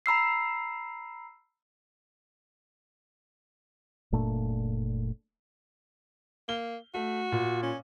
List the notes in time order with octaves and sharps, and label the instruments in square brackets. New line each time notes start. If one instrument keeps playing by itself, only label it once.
[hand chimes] A#5 B5 E6 C7
[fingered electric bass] F#1 A#2 A3 D4
[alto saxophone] A#3 [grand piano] G7
[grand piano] A3 [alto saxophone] F#4
[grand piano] A#2
[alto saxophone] C#4